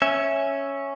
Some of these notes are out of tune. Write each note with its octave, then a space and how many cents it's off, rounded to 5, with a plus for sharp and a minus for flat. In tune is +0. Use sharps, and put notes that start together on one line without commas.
C#4 +0 E5 +0